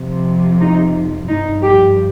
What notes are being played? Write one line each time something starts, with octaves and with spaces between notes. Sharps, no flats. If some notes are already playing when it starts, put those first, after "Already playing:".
Already playing: F2 C3 F3
D#4
G2 F3 D#4
G4